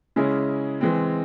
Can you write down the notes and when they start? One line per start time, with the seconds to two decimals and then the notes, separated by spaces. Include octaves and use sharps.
0.16 C#3 G#3 C#4 E4
0.81 E3 G#3 C4